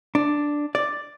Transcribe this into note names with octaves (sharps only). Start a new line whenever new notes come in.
D4
D5